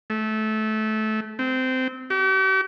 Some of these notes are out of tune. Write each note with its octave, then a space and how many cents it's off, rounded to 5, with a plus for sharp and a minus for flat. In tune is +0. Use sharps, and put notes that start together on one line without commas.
A3 -20
C4 -20
G4 -45